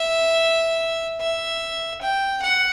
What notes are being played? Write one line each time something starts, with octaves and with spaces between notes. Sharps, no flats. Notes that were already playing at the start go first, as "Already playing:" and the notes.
Already playing: E5
E5
G5
F#5